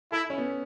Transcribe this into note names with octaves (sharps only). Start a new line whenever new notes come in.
E4 A4
C#4
B3